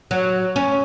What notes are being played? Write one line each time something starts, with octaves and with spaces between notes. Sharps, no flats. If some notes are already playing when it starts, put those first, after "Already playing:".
F#3
C#4